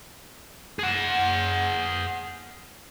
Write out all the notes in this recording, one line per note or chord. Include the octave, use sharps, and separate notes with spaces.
G#4 F#5